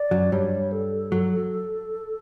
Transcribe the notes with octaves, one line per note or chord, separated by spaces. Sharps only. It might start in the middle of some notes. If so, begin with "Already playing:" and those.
Already playing: D5
F#2 F#3
G2 G3 C#5
A4
F#3